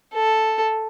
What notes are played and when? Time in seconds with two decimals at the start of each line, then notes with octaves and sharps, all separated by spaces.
0.13 A4